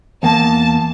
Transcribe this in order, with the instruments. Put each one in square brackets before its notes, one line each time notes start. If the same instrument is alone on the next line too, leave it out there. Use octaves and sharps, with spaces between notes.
[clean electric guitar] E2 A#3 [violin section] A5